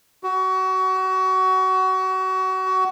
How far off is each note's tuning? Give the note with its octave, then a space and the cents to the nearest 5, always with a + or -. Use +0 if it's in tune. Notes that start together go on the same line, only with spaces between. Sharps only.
F#4 +25